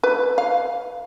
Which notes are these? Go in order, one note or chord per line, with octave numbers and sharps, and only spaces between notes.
B4
F5